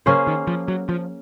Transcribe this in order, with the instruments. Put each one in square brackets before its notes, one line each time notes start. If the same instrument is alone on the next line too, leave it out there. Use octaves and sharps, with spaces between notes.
[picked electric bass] C#3 [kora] A#3 C#4 G#4 C5
[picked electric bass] D#3
F3
F#3
F3